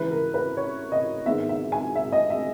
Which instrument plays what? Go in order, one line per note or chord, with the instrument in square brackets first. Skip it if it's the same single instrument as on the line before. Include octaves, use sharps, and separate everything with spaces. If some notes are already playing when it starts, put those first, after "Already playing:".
Already playing: [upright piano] C#3 E3 G#3 B4
A#4
B4
C#5
D#5
G#2 D#3 G#3 B3 E5
E5
G#5
E5
D#5
E5